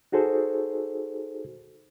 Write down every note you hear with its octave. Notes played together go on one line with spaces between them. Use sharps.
D#4 F#4 G#4 A4 C5